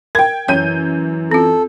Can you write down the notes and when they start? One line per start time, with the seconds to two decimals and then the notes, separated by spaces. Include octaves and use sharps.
0.15 A#4 G5 G#6
0.48 F#2 E3 C#5 G6 D#7
1.31 C4 F4 A4